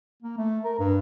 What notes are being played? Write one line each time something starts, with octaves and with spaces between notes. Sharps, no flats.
A#3
A3
A#4
G2